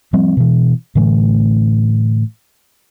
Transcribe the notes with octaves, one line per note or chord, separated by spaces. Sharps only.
F3 G3 C4
B2 E3
A2 D3 E3 A3